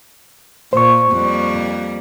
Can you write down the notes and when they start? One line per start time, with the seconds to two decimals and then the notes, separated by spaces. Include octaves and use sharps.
0.73 A#2 C5 C#6
1.12 F2 G3 A#3